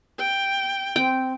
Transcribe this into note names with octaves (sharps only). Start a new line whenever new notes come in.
G5
C4 G5